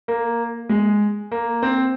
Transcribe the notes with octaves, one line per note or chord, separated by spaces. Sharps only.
A#3
G#3
A#3
C4